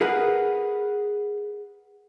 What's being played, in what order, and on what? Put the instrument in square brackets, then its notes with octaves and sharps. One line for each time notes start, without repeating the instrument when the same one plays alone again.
[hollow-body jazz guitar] G#4 A#4 B4 D#5 F#5